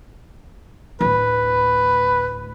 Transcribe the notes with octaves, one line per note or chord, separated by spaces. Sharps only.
D2 A2 B4